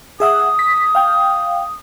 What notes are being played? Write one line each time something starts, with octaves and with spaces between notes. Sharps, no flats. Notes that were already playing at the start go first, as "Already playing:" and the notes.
G#4 E5 F#5 D#6
B6
F5 G5